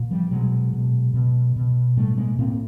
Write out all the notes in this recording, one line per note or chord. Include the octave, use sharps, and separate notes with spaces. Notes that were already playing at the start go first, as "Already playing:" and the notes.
Already playing: A#2
F3 G3
B2 F#3 G#3
B2
B2
B2
A2 G3 A3
G#3 A#3
A2 A#3 C4